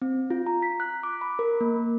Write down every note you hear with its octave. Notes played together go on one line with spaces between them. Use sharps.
C4
F4
A#5
B6
F#6
D6
B5
A#4
A#3